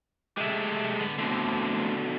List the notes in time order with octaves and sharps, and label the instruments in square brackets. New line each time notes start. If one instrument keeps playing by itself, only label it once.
[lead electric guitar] G#3 A3 [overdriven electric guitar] G4 E5
[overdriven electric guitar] D3 B3
[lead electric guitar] B2 D3 [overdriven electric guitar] A3 C4